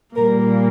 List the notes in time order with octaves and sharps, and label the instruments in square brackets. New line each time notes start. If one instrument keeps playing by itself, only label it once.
[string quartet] A#2 G3 A#3 A#4